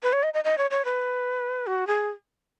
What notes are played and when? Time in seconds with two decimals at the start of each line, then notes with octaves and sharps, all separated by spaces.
0.03 B4
0.13 C#5
0.23 D#5
0.34 D#5
0.44 D#5
0.58 C#5
0.71 C#5
0.85 B4
1.67 F#4
1.87 G#4